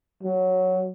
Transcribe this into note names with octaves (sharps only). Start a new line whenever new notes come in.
F#3